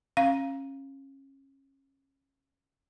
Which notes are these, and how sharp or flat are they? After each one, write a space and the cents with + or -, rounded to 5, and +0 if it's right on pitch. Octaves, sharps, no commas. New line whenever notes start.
C#4 -30 F5 +0